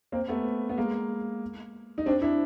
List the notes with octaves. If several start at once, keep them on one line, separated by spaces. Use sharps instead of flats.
A#3 C4
A3 B3
B3
G#3 A#3
D#4
C4 D4
D4 E4